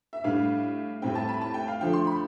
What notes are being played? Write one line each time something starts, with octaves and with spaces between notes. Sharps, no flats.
E5
A2 G3 D4 F5
A2 G3 C4 G5
A5
B5
A5
G5
F5
D3 F3 A3 G5
C6
B5